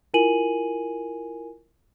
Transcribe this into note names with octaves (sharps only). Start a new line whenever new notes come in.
E4 F4 A#4 G#5 D#7 F#7